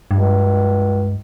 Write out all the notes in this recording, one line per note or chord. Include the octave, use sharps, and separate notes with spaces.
C#2 G2